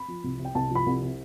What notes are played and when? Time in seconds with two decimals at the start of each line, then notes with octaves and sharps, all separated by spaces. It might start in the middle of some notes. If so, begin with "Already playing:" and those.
Already playing: B5
0.08 F3
0.24 C2
0.39 C3
0.45 G5
0.55 C2 A5
0.70 F3
0.75 B5
0.86 C2
1.02 C3